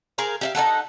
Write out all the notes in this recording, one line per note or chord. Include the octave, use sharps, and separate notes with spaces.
G#4 A#4 C5 F5
G4 E5 F5
D#4 F4 A4 F#5